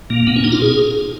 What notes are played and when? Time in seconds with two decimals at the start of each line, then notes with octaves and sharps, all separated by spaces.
0.10 A#2 A#3
0.27 A#2 B3
0.36 C#4
0.44 A#2 D#4
0.52 F4
0.62 G#4